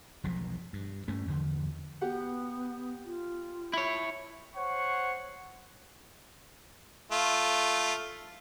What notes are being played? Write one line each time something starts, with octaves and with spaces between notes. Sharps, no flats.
E1 B1 B2 F3
G2
G2 A3 C#4
E2 D3 F3
B3 G4 F#5
F4
E4 C#5
C5 C#5 F#5 C#6
A3 F4